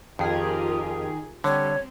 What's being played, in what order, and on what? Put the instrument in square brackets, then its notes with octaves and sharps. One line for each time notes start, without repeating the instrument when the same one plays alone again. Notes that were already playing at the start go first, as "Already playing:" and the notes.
[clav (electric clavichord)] F2 [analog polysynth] D#3 G#4 [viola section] F4 G4 A#4
[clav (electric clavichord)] D3 [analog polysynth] G3 [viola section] C4 [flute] C#5